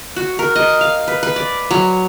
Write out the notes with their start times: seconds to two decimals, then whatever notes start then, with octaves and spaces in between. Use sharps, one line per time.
0.16 F#4
0.39 A#4
0.56 D#5
0.81 F5
1.08 B4
1.23 B4
1.36 D5
1.71 F#3